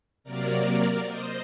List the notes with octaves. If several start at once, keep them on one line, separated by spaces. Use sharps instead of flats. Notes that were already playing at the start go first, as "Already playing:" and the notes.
C3 F#3 A#3 A#4 D5
C5 D#5